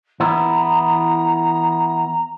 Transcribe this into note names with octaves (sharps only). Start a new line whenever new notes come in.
E3 B3 E4 A#5